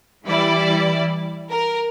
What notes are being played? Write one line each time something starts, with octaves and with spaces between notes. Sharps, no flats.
E3 G3 E4 D5
A#4